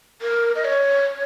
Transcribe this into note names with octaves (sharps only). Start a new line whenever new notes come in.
A#4
D#5
C#5